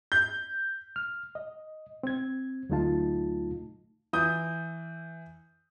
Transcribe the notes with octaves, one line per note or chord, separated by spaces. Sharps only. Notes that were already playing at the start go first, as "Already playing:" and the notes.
G6
F6
D#5
C4 G#6
D2 F#3 A3 D#4 F4 A5
E3 D#6 G6